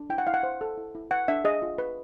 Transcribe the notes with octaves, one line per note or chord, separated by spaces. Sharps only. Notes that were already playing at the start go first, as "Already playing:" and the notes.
Already playing: D4
E4 G5
F#5
E4 F5
F#5
C5
A4
E4
E4
B4 F#5
D4 E5
G#4 D#5
F4
B4